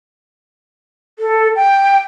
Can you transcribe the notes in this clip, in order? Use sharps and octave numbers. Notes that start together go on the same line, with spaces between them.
A4
G5